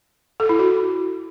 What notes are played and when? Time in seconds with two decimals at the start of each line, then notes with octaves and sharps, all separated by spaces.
0.40 A4
0.49 E4
0.59 F#4